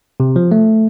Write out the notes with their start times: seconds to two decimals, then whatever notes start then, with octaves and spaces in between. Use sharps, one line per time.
0.20 C3
0.36 F3
0.51 A3